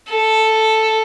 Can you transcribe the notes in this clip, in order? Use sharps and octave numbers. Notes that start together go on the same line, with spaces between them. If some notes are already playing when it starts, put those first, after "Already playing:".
A4